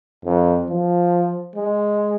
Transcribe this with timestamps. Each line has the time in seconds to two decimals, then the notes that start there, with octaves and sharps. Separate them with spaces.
0.25 F2
0.69 F3
1.55 G#3